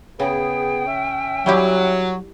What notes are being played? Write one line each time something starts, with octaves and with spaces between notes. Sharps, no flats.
C#3 B3 G#4 G5
C#4 E5
F#3 G3 E4 G4